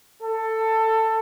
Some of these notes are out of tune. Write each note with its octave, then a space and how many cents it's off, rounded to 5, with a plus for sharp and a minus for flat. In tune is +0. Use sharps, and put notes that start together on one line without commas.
A4 +15